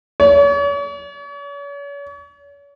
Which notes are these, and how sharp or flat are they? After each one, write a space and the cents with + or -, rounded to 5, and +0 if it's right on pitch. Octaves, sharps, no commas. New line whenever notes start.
C#5 +40